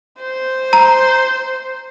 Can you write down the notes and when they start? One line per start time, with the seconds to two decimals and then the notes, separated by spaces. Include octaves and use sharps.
0.21 C5
0.73 A#5